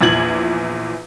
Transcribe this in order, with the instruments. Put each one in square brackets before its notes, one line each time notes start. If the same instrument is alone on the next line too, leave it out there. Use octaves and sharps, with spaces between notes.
[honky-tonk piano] A#1 E2 A#2 G#6 F#7